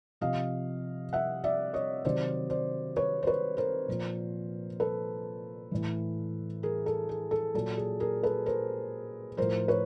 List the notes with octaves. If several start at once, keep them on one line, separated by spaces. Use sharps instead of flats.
C3 F3 D#5 F5
E5 F#5
D5 E5
C#5 D#5
C3 D#3 F#3 C5 D5
C5 D5
B4 C#5
C5
B4 C#5
A#4 C5
A#2 F3
A4 B4
A2 E3
G#4 A#4
A4
G#4
A4
A#2 F#3 A4
G#4
G#4 A#4
A4 B4
A#4 C5
A2 F3 A#4 C5
B4 C#5